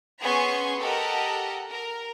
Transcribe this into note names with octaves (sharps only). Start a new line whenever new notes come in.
B3 C#4 G#4 G#5 C6 C#6
G4 A4 A#4 D#5 F#5 A5
A#4